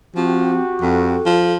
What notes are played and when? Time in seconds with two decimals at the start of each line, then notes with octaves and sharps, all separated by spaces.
0.16 F3 C4 F#4 G4
0.82 F2 A4
1.26 F3